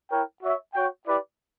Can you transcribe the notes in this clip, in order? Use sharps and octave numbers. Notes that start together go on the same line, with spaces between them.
E4 A#4 C#5 G5
F#4 C#5 E5
F#4 C#5 G5
E4 G4 B4 D5